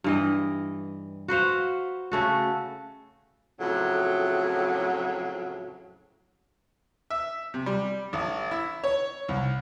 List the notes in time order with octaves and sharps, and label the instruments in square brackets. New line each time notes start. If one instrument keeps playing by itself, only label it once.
[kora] G2 E3 D#5
F#4 B4 C5 F5
C#3 A3 F#4
[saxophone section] F2 A2 C#3 F#3
[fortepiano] E5
C3
G3
A1
E4
C#5
C2